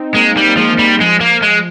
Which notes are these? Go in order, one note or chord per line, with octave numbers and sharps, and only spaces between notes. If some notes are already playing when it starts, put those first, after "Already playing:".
Already playing: C4 D#4
G#3 A#3
G3
A#3
F3 G#3
G3
F3 G#3
A#3
G#3